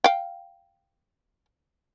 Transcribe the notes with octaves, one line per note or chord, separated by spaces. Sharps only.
F5 G5